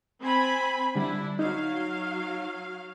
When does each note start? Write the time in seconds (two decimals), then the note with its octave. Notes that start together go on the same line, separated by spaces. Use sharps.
0.22 C4 G#5 B5
0.95 D3 G3 D4 E4
1.39 F#3 D#4 F5